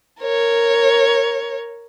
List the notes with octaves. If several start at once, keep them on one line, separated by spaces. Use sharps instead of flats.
A#4 C#5